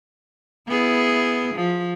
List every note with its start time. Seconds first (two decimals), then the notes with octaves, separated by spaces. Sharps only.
0.68 B3 E4 G#4
1.55 F3